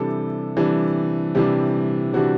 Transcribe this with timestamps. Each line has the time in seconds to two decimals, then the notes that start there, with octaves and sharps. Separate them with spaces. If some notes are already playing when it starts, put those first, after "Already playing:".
Already playing: C3 E3 G3 D4 A4
0.57 C3 E3 G3 D4
1.35 C3 E3 G3 D4 G4
2.14 C3 E3 G3 D4 F#4